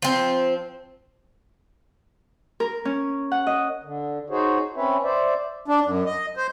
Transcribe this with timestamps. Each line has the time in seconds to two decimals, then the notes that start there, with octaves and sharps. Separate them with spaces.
0.02 F3 C4
2.60 A#4
2.85 C#4
3.32 F#5
3.47 D#5
3.83 D3
4.30 D#4 F#4 G#4 C5 C#5
4.76 C4 C#4 B4 C#5 E5
5.03 C5 D5 E5
5.68 D4
5.86 F#2
6.06 D#5
6.37 C5